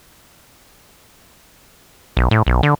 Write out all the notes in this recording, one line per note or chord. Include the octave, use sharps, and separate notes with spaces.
B1
A2
B1
D3